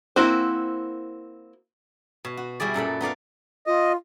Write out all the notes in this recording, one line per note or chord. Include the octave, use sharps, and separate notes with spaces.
A#3 C4 E4 F#4 C5
B2
F#4
B2 G3 E4 G#4 D5
F#2 A#2 A4 B5
B3 D#4 D5 F5
F4 D#5